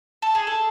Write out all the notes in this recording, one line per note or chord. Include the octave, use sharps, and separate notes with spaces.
A4
G#4
A4